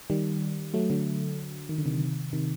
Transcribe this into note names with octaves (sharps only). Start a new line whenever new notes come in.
D#3 G3
F#3 A3
D3 F#3
D#3
D3
C3 D#3
C3 D#3